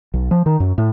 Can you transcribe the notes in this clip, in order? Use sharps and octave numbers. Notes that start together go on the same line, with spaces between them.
B1
F3
D#3
F#2
A2